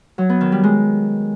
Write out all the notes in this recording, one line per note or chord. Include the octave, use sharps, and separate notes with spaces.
F#3
B3
D#3
G3
G#3